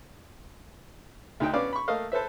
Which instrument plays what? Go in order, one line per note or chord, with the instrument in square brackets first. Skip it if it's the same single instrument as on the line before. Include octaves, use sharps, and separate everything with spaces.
[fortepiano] D2 D#4 G5
B3 C#4 D5 F5
B5 C#6
A3 A#3 D#5 F5
A4 B4 C5 E5